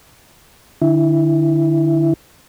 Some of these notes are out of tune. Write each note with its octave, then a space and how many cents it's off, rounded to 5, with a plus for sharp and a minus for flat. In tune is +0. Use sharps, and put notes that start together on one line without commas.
D3 +30 E4 +0